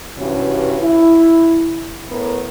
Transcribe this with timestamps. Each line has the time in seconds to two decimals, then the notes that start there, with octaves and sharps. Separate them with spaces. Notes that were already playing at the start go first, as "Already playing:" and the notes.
0.18 G2 C3 E3 C#4 F#4
0.80 E4
2.08 A2 B3 A#4 B4